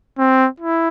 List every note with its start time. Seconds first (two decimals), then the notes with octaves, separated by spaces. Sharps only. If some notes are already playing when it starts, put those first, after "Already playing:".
0.19 C4
0.60 E4